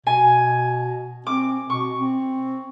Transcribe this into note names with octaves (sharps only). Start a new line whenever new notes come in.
B2 G#5
C4 D6
B2 C#6
C4